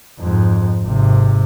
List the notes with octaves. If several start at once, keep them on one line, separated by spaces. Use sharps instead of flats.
F2 G#2
G#1 C3